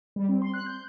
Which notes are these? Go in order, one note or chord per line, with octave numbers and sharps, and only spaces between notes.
G3
C4
C6
F#6
G6